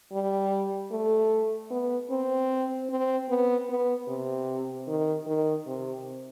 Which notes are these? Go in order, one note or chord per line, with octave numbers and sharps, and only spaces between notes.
G3
A3
B3
C4
C4
B3
B3
C3
D#3
D#3
C3